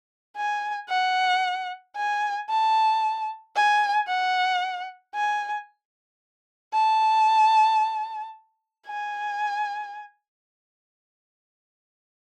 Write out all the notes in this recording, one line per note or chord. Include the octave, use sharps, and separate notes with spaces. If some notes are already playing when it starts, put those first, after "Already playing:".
G#5
F#5
G#5
A5
G#5
F#5
G#5
A5
G#5